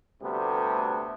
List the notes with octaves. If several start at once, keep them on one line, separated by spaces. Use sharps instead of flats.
D2 C3 G3 A3 B3